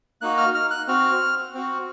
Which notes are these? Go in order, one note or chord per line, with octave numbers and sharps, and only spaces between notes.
A#3 D#4 F#4 F#6
F6
F6
F#6
C4 F#4 F6
C4 F#4